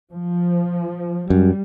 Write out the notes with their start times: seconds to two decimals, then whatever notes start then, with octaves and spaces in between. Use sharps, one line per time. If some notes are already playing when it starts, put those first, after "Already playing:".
0.10 F3
1.30 F#2 G3